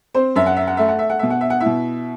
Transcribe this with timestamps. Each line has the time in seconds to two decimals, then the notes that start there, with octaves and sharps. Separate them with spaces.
0.14 C4 C5
0.36 F#2 E5
0.46 F#5
0.57 E5
0.67 F#5
0.77 A3 E5
0.89 F#5
0.99 E5
1.10 F#5
1.19 B2 E5
1.30 F#5
1.41 E5
1.50 F#5
1.60 E4 E5
1.66 B2